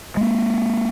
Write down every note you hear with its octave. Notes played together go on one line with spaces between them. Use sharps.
G#3 A#3